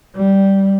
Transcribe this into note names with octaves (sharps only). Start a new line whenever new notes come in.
G3